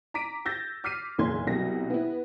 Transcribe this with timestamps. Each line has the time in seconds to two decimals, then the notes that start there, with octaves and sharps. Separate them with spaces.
0.14 A#5 D6 B6 D7 D#7
0.45 E6 G6 A6 A#6
0.84 D6 F6 B6 C7 D#7
1.18 F#1 B1 E2 C6 G#6
1.47 C2 B2 F#3 A#6
1.90 B3 E4